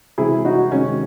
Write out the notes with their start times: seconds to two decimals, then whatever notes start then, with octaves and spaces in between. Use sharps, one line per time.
0.18 C3 E3 G#3 E4 G#4
0.45 D#4 F#4
0.72 C3 D#3 G#3 C#4